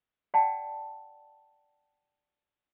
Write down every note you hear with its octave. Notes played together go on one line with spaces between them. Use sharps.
D5 F#5 G5 A5